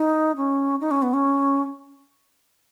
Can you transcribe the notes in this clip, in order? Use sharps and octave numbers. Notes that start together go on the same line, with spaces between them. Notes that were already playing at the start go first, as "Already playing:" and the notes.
Already playing: D#4
C#4
D#4
C#4
B3
C#4